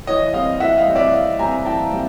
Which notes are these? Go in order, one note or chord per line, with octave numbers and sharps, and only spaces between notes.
E3 C#5 D#5
G3 C4 D#5 F5
E3 E5 F#5
D#5 F5
G3 C4
D5 E5
E3 D#5 F5
G3 C4 G#5 A#5
E3 G5 A5
G3 C4